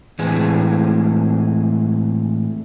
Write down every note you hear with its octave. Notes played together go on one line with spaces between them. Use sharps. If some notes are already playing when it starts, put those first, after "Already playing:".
A2 E3 G#3 C4 G#4